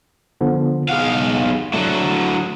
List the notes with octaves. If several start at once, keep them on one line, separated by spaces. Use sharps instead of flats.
D3 F3 B3
B1 G#4 F5 F#5
D3 F#3 A3